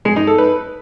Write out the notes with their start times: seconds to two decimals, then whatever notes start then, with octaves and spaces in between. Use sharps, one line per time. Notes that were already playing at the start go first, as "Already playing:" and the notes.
0.05 G#3
0.16 D#4
0.27 A4
0.38 B4